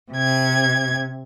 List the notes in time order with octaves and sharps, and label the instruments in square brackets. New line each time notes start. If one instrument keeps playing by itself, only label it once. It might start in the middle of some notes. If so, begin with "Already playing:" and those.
[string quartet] C3 G#6